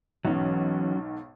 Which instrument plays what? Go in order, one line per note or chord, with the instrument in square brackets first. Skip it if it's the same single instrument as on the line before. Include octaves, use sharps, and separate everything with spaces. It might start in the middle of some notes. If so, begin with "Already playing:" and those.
[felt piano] B1 G#2 [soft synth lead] E3 [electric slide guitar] F#3 C#4